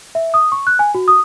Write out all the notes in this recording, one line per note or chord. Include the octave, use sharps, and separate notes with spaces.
E5
D#6
C#6
F#6
G#5
F#4
D#6